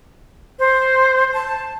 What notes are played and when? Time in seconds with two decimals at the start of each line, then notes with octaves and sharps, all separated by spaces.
0.59 C5
1.33 A5